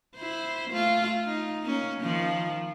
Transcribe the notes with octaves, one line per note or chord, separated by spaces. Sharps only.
E4 C5
A3 F4
D#4
A#3 C#4
D#3 F3